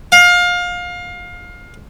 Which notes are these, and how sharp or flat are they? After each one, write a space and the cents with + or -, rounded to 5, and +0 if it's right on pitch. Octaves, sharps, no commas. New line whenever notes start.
F5 +25